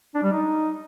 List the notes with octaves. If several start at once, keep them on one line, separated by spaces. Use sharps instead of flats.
D4
G3
D#4